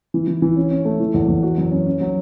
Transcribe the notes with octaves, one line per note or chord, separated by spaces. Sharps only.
E3
E3
E3
C#4
C#4
A3
E3
E2
E2
F#4
F#2
C#4
C#4
F#3